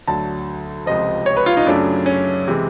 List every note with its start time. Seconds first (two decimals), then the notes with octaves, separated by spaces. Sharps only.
0.07 D2 D3 F#3 A5
0.86 C#2 C3 F3 D#5
1.26 C#5
1.37 B4
1.46 F4
1.57 D#4
1.66 F#2 C#3 F#3 A3 D4
2.06 C#4
2.48 C3 E3 G#3